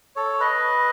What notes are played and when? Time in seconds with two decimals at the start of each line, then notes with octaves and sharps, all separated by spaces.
0.16 A4 C#5
0.40 B4 D#5